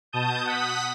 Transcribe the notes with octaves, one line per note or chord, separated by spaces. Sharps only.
B2 A5 D#6 G6
F#5 D#6 B6